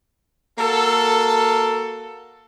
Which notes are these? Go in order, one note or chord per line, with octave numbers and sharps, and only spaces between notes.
A#3 F#4 A4